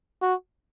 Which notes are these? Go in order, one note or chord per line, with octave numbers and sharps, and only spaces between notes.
F#4